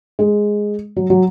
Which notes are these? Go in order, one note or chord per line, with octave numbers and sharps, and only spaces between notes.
G#3
F#3
F#3